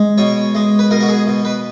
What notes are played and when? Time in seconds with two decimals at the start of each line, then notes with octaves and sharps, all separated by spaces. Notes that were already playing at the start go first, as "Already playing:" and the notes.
Already playing: G#3
0.18 B2 C#5
0.55 G#3
0.79 B4
0.91 B2 A#4
1.01 F#4
1.08 G#4
1.27 B2
1.45 B4